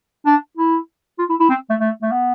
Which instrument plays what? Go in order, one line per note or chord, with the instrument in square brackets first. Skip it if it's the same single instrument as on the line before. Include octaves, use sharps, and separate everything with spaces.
[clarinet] D4
E4
F4
E4
E4
C4
A3
A3
A3
B3